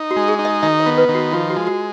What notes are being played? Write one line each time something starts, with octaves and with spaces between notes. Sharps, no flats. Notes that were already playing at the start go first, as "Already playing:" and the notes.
Already playing: D#4
F#4
G#3
G#4
D#4
D#5
D#3 D#5
C#5
B3
B4
D#3
F#4
F3 F4
F#4
G#3
F#4